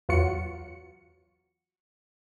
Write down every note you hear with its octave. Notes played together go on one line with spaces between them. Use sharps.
E2 F#3 F4 F#4 C#7